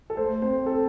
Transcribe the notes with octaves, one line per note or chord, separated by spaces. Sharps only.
A4
A3 C5
C4 C5
A4